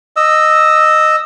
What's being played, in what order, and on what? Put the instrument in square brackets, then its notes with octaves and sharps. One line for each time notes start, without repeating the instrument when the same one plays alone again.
[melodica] D#5 E6